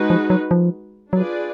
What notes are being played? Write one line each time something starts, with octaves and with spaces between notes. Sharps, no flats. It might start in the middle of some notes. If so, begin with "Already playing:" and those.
Already playing: G#3 D#4 F#4 B4
F3
F#3
F3
F#3 D4 F4 G#4 B4 D5